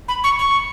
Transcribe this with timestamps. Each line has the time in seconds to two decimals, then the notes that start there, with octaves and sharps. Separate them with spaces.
0.08 B5
0.24 C#6
0.39 C#6